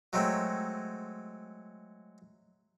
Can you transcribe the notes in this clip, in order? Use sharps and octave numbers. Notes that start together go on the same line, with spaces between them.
F#3 G#3 A3 C4